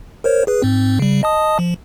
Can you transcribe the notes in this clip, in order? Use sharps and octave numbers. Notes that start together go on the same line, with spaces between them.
A#4 C5 C#5
G#4 B4
G#2 C4
C#3 G3
D#5 A5 D#6
F3